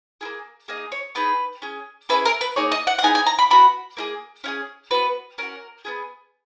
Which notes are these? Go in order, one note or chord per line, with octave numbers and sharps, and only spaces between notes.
A#3 E4 G#4
A#3 D#4 G#4 D#5
C#5
B3 D#4 G#4 B4
C#4 G#4
C#4 E4 G#4 B4
A#4
B4
A#3 D#4 G#4 C#5
D#5
F#5
F#5
B3 D#4 G#4 G#5
G#5
A#5
B5
B3 F#4 B5
A#3 E4 G#4
C#4 E4 G#4
B3 F#4 B4
C#4 F#4 A#4
B3 E4 G#4